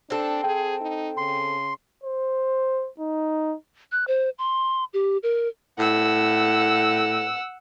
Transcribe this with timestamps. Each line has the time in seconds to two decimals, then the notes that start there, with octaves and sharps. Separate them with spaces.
0.10 C4 D4 A4
0.44 G#4 G5
0.81 D#4
1.17 C#3 C6
2.04 C5
2.99 D#4
3.92 F#6
4.07 C5
4.38 C6
4.94 G4
5.23 A#4
5.79 A2 F#5 E6